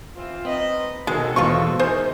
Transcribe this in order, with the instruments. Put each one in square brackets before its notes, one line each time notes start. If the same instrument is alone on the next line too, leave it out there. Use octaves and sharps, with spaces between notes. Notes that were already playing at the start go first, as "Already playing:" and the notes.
[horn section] E3 C4 F4
[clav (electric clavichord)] C4 [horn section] D#4 B4 D#5
[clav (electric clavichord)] B2 D#3 [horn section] F#3 C4 A4 [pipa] G#3
[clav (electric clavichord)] E2 G#2 B2 [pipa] F3 F4 C#6
[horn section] E3 D#4 [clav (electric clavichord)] G#4 A#4 G#5 [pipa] C5